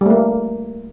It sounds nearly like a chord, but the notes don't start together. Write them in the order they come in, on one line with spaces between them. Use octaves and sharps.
G3 A3 A#3